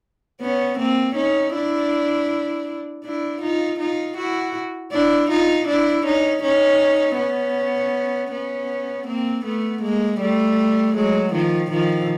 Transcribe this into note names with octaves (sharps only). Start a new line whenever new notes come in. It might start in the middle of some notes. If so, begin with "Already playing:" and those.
B3 C#4
A#3 C4
C#4 D#4
D4 E4
D4 E4
D#4 F4
D#4 F4
E4 F#4
D4 E4
D#4 F4
D4 E4
C#4 D#4
C#4 D#4
B3 C#4
B3 C#4
A#3 C4
A3 B3
G#3 A#3
G3 A3
F#3 G#3
D#3 F3
D#3 F3